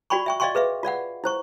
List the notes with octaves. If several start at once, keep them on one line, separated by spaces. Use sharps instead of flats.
F4 F#4 D5 G5 B5 C#6
E5 G5 C#6
D5 D#5 F5 G5 C6 C#6
G#4 B4 E5 F5
F4 D5 F5 F#5
E4 C5 C#6